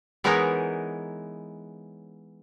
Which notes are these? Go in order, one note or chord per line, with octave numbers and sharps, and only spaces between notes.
E3 G#3 B3 D#4 A#4 C#5